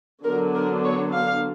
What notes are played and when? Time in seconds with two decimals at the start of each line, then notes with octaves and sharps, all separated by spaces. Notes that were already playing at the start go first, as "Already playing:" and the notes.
0.24 D3 F#3 B3 D4 A#4
0.55 A#4
0.84 C#5
1.14 F5